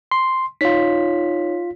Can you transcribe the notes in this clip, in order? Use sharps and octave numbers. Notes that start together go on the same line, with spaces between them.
C6
D#4 F4 C#5 B6